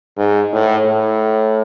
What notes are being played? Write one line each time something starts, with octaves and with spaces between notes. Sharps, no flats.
G#2
A2
A2